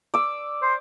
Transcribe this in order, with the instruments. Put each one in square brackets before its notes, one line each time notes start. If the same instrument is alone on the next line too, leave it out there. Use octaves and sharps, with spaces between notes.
[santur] D5 E6
[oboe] C5